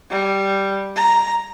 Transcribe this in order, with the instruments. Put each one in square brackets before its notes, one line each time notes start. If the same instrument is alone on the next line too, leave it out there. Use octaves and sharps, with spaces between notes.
[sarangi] G3
A#5